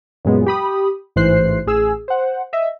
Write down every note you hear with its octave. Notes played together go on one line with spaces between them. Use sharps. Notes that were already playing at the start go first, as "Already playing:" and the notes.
F#2 A#2 G#3 B3
G4 B5 D#6
A1 G#2 E3 C5 F#6 C7
A1 G#4 E6
C5 F#5
D#5 E5